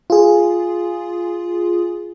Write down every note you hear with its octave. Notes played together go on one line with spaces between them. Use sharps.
F4 G#4